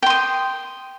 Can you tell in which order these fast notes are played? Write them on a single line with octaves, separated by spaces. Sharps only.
G5 C6 D#6